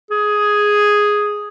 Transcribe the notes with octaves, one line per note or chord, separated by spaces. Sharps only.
G#4